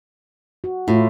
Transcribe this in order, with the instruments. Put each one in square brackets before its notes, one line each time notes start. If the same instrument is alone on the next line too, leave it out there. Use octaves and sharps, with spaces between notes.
[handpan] F#4
[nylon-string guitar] A2 [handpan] E4 F4